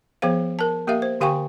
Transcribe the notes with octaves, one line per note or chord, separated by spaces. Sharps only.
F3 B3 G#4 C5 F5
A#4 A5
A#3 G4 A#4 E5 F5
C5
D3 G4 F5 G5 G#5 C#6